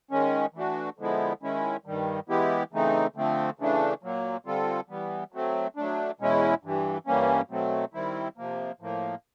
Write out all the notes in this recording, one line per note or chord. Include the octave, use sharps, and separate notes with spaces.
D#3 G#3 C#4
E3 A3 D4 F#4
D3 F3 G#3 B3 E4
D#3 G#3 C#4 E4
G2 D#3 G3
E3 G#3 B3 E4 G4
C#3 E3 A3 C4 D#4
D3 F3 A3 C4
C#3 E3 A3 D4
A#2 F#3 A#3
D3 G3 C4 F4 A4
E3 G3 B3
F#3 A3 C4
F#3 A3 D4
E2 B2 G#3 C#4 E4
G2 E3 G3
G2 E3 G3 A#3 C#4
B2 F#3 A3 C4
D#3 G3 C4 E4
C3 F3 A#3
A2 F3 A#3